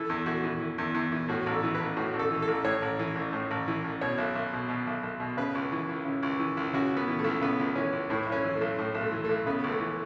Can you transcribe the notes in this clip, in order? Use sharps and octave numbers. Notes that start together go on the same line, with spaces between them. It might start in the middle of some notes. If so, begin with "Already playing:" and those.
Already playing: E3 A4
E2
E2 F#4
E3
E3
E2
E2
E3
A2 F#4
A1 A4
E3
B4
A1
A2 F#4
A1
A4
E3
A4
A1
A2 C#5
A1
E3
A1
A2
A1
E3
A1
B2 C#5
B1
B1
B2
B2
B1
B1
B2
C#3 B4
C#2
E3
C#2
C#3
C#2
E3
C#2
C#3 F#4
C#2
B3
E3
A3
C#2
C#3 B3
C#2
E3 C#4
C#2
A2 E4
B1
C#4
E3
A3
B1
A2
B1
A3
E3
A3
B1
C#3 B3
C#2
A3
E3